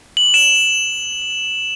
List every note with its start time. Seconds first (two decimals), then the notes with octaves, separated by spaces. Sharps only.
0.17 F#7
0.34 E7